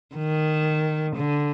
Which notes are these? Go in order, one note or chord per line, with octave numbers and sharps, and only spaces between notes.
D#3
D3